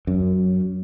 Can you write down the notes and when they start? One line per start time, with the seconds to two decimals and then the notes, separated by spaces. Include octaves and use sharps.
0.07 F#2